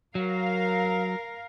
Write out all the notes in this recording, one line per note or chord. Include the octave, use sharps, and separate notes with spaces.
F#3 A#4 F5